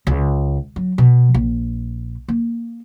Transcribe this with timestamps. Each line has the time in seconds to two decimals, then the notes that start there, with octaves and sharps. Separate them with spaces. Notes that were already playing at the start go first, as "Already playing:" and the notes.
0.07 C#2
0.76 F#3
0.98 B2
1.34 A#1
2.28 A#3